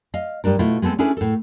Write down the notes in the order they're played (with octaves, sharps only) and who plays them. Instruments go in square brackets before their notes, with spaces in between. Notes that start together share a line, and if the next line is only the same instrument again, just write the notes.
[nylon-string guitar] D#5 F5
G2 G3 D4 A#4
B2 A3 E4 F4
G#3 B3 C4 A4
C#4 D4 E4 G#4 A4 B4
A2 A4